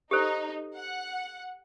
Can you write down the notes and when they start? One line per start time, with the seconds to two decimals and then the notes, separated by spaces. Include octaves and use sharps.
0.11 D#4 G4 A4 C5
0.75 F#5